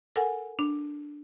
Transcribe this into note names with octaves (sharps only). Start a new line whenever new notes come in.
A4 A#4 F#5 G#5
D4